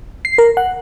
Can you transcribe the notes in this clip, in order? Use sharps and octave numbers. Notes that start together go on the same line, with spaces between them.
C7
A#4
F#5